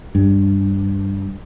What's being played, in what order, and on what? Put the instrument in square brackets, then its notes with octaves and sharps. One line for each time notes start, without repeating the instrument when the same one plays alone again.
[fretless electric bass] G2